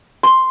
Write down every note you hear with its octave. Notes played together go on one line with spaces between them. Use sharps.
C6